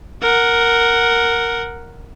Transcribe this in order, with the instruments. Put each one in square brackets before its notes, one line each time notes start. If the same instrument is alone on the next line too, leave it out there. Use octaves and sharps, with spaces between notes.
[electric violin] A#4 F#5